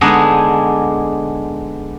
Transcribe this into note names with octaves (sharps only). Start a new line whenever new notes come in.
D3 G#3 B3 D4 D#4 G#4